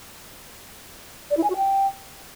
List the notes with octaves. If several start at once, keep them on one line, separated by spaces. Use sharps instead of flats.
D5
E4
G#5
F#4
G5